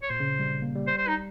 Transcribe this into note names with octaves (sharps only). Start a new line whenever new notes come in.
C#5
A#2 C5
C#3
G3
A#3
G3
C5
C5
D#4